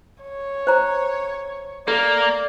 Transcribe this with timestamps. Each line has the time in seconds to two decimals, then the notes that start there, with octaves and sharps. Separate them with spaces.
0.22 C#5
0.67 C5 A#5
1.88 A#3 A4 D5